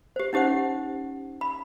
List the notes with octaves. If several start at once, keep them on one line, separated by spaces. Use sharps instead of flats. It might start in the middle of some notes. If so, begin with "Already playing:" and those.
G4 C5
C#4 D#4 G4 C5 F#5
B5